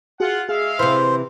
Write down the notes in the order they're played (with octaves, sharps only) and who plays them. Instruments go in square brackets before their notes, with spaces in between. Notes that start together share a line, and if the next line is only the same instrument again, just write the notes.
[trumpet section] F4 F#5 [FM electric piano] F#4 G#4
[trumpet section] G#3 E5 F5 [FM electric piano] G#4
[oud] C3 E3 [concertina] C5